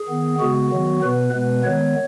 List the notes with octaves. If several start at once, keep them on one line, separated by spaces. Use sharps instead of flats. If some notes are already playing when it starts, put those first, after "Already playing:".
Already playing: G#4
D#3 B3
C#3 G#3 B3 F#4
D#3 F#3 B3
B2 B3 B4
B2 G#3 B3 B4
D#3 G#3 B3 C#5